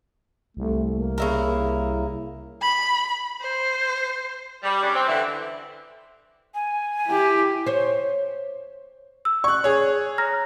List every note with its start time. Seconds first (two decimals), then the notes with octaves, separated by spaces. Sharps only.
0.57 C2 A3
0.91 A#3
1.18 C#3 E4 A#4
2.61 B5
3.41 C5
4.63 G3
4.83 C#3 G3 D4
4.95 C4
5.08 D3 E3
6.55 G#5
7.06 E4 G4
7.66 C5 C#5
9.25 E6
9.44 D5 C#6 F#6
9.64 G#4 C#5
10.18 A#5 F6 A#6